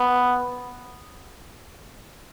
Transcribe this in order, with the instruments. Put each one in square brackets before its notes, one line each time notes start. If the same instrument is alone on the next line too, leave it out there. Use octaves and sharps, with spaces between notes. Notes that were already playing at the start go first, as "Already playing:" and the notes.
Already playing: [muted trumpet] B3